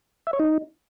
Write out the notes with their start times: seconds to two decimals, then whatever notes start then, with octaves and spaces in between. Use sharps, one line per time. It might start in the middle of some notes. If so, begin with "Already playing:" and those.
0.27 E5
0.33 C#5
0.39 D#4